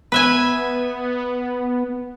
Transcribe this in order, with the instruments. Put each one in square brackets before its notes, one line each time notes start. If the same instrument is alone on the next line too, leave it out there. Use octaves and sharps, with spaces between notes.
[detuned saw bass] B3 [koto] B4 E5 G#5